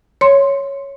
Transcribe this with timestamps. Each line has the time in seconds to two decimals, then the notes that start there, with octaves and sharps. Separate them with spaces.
0.21 C#5 C6